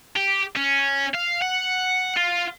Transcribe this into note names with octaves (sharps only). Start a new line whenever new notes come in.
G4
C#4
F5
F#5
F4